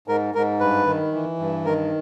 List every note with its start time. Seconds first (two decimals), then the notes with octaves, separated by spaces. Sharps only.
0.08 G#2 A#4
0.35 G#2 A#4
0.60 G2 B4
0.87 D#3
1.13 E3
1.39 G2
1.65 D#3 A#4